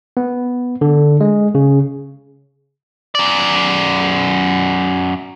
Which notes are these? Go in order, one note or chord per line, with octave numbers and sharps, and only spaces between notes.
B3
D3
G#3
C#3
F#2 D5